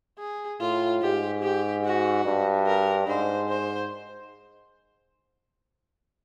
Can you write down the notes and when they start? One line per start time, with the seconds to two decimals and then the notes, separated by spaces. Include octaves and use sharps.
0.19 G#4
0.60 A2 F4
1.02 G#2 G4
1.42 G4
1.84 F#4
2.25 G2
2.67 A#4
3.08 G#2 C5
3.49 C5